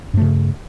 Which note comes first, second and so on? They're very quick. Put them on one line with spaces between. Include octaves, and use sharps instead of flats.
G2 A3 C#3